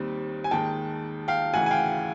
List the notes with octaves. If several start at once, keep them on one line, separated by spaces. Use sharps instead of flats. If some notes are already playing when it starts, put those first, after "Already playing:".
Already playing: D#2 D#3 G3 C4
G#5
D#2 D#3 G#3 G5 A5
F5 G5
D2 C#3 E3 F#5 G#5
G#5
F5 G5